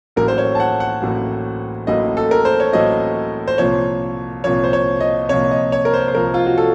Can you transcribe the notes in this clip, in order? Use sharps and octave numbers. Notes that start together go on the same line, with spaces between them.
A1 A2 F#3 A#3 A#4
C5
C#5
A5
F#5
F#5
A1 A2 F#3 A#3
A1 A2 F#3 A#3 D#5
A4
A#4
C5
C#5
A1 A2 F#3 A#3 D#5
C5
C2 A#2 F3 A#3 C#5
C2 A#2 F3 A#3 C#5
C5
C#5
D#5
C2 A#2 F3 A#3 C#5
D#5
C#5
A#4
C5
C5
C2 A#2 F3 A#3 A#4
F4
F#4
A4